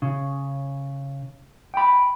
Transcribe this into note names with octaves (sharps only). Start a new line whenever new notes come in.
C#3
G5 B5